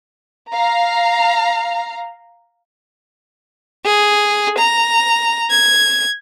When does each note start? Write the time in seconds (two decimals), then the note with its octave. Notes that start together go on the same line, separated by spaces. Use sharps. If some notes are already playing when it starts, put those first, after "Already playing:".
0.53 F5 A#5
3.86 G#4
4.58 A#5
5.51 G#6